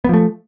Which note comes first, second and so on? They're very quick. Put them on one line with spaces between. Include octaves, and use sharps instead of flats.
B3 F3 A3